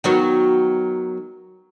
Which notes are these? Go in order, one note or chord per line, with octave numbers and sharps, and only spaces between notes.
D#3 F#3 B3